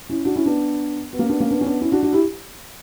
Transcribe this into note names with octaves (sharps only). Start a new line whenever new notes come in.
C#4 E4
D4 F#4
C#4 E4
B3 D4
B3
A#3 C#4
B3 D4
A#3 C#4
B3 D4
C#4
B3 D4
C#4 E4
D4 F#4
D4 F#4
E4 G4